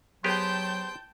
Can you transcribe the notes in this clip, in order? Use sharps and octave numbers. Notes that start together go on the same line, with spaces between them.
F#3 B3 G4 G#4 C5 G5 A5 G6
C5